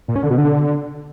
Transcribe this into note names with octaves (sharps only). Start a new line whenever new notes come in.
A#2
C#4
D3
B2
D3